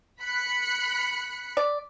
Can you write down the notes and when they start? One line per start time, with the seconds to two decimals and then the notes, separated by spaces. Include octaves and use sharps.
0.20 B5 F#6 C#7
1.57 D5